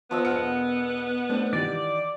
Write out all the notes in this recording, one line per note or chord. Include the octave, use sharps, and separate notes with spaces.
F3 B3 D#5 E6
E1 F#5 F6 C#7
A3 C4 D4
D#3 E3 G4 D5